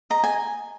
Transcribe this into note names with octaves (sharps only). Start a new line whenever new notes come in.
D#5 A#5
G#5